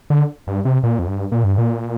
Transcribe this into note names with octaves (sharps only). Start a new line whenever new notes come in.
D3
G2
C3
A#2
F2
G2
A#2
G2
A#2